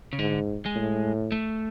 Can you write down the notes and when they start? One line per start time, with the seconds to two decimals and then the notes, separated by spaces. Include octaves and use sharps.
0.13 C#3
0.19 G#2 D3
0.66 G#3
0.75 A2
1.32 A3